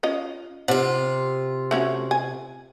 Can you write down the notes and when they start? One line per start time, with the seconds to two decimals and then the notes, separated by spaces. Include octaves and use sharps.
0.03 C#4 F4 D#5
0.68 C3 F4 F#5
1.71 A3 C#4 F#4
2.11 G#5